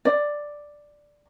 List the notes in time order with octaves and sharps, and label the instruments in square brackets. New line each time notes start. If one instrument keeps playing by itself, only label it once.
[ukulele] D5